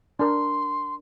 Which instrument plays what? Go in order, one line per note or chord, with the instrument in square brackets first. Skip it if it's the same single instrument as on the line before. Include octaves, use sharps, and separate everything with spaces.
[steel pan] D4 A#4 [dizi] C6